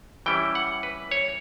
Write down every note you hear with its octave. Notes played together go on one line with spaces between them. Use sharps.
E3 G3 C#4 E4 G5
F#5
B4
C#5